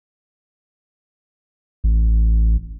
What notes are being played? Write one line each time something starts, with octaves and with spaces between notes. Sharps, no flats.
A1